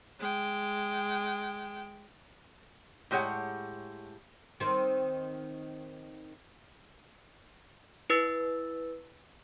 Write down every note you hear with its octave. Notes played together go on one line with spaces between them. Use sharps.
G#3 G5
A2 G#3 G4 C#5 F#5
D#3 C4
E4 B4 E6 A6